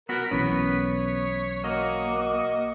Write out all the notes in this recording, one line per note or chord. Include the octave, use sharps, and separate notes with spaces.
B3 F#4 A#4 B6
B1 E3 B3 C#4 B4 C#5
A#3 F#4 D#5